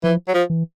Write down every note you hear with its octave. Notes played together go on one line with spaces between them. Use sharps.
E3 F3
F#3
F3
E3